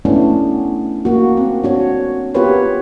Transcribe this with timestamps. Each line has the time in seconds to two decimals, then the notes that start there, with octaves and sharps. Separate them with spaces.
0.05 A3 B3 C#4 D4 E4
1.05 A#3 F#4
1.37 C4
1.63 D4 F#4 C#5
2.34 B3 F4 G4 A#4 B4 C#5